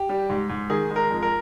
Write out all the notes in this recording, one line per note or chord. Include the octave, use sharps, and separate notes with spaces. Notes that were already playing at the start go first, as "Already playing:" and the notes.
Already playing: G4
G3
G#2
G#2
D#3 G#4
G#3
A#4
F2
A#4